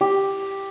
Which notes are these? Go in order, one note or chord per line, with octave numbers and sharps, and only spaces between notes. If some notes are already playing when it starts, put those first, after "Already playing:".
G4